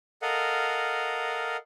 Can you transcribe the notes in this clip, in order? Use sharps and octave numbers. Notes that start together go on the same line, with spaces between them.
A4 A#4 D#5 F5 F#5